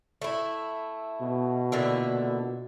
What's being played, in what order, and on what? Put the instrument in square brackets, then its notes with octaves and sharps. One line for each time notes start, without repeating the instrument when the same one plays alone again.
[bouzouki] A3 E4
[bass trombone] B2
[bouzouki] A#2 D3 E4